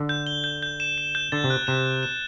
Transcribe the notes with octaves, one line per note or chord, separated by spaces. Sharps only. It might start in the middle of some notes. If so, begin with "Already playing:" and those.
Already playing: D3
G6
G7
G6
G6
E7
E7
G6
D3 A6
C3
F#6
C3 E7
F#6
E7